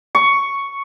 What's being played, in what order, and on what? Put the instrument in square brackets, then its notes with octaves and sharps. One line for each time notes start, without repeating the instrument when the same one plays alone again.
[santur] C#6